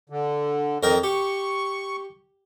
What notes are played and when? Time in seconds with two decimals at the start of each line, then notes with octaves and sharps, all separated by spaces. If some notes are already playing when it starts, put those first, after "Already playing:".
0.10 D3
0.83 F2 D#3 A#4 D#5 G5
1.03 G4 C#6